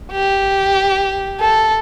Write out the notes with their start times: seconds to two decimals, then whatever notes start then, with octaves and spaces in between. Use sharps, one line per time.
0.11 G4
1.40 A4